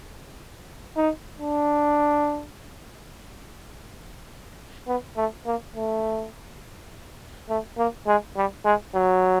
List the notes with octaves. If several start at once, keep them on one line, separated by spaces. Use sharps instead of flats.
D#4
D4
B3
A3
A#3
A3
A3
A#3
G#3
G3
G#3
F#3